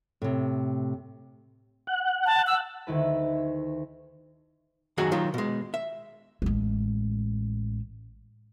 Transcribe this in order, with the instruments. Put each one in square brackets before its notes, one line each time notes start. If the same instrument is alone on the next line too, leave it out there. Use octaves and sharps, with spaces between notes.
[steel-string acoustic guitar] A2 C3
[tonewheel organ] F#5
[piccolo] A5
E6
[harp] D2 D#3 E4 B4
[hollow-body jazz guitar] F#2 D#3 F#3 F#4 G#4 F#5
D#3 F#3 F4
B2 G#3
E5
[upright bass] A1 G#3